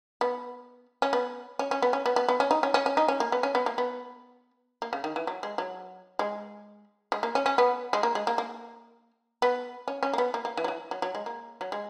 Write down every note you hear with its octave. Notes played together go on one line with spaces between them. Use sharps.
B3
C#4
B3
C#4
C#4
B3
C#4
B3
B3
B3
C#4
D#4
C#4
C#4
C#4
D#4
C#4
A#3
B3
C#4
B3
A#3
B3
A#3
C#3
D#3
E3
F#3
G#3
F#3
G#3
G#3
A#3
C#4
C#4
B3
G#3
A#3
G#3
A#3
A#3
B3
C#4
C#4
A#3
B3
A#3
A#3
E3
F#3
E3
F#3
F#3
G#3
A#3
F#3
G#3